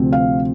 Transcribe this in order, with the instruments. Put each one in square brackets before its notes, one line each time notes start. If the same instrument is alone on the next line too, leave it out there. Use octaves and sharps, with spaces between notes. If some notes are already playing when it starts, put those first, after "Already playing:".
Already playing: [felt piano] D2 C3 F3 C4
F5